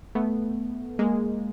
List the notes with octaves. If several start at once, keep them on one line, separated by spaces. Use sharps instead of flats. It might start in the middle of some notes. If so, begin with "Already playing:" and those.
A3 B3
G#3 A#3